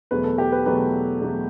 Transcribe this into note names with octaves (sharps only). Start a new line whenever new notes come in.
E2 B2 F#3 A3 B4
A4
G4
B4
E2 B2 F#3 A3 B4
E2 B2 F#3 A3